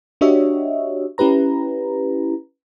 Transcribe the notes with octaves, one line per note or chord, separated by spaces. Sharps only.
D4 F#4 G4 C#5 D#5 E5
C#4 E4 G4 B4 A#5